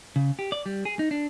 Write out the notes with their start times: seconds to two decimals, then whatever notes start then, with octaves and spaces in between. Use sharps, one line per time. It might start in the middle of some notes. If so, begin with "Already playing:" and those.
0.16 C#3
0.39 G4
0.52 D5
0.66 G3
0.85 G#4
0.99 D#4
1.11 D4